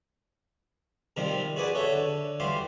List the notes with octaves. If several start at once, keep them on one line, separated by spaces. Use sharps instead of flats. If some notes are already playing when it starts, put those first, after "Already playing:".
C3 D#3 F3 G3 C4
F#4 G#4 B4 D5 F#5 G#5
F#4 A4 C#5 E5 F#5
D3
E3 G3 F#4 G4 F5 C6